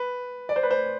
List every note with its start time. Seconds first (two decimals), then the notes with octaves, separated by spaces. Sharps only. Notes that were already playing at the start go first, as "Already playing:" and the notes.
Already playing: B4
0.49 D5
0.56 C5
0.63 B4
0.71 C5